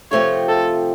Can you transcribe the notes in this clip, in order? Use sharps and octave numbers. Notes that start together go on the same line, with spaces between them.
C3 F3 A3 C4 F4 C#5
A4